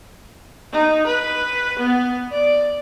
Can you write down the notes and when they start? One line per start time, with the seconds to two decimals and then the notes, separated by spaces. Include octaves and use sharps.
0.73 D#4
1.06 B4
1.79 B3
2.31 D5